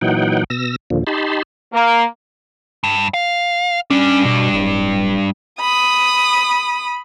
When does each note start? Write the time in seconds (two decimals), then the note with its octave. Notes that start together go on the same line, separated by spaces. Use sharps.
0.01 A#2 E3 F#3 D#4 F#5 G5
0.50 B2 E6 A#6
0.90 D#2 A#2 D3 F3
1.07 D#4 G4 A5 B5 C6
1.73 A#3
2.84 G2
3.14 F5
3.91 G3 C#4 D4
4.25 B2
4.53 D1
5.61 B5 D#6